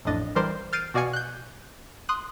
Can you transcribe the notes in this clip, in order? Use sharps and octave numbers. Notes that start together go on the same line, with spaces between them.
A1 F2 A2 D4 D#5 A6
E3 G3 A#4 C5 D5
F6 G6 A6 C7 D7 D#7
B2 F#4 D5 F5 G#5 C#7
F#6 G6
C6 D#6 F#6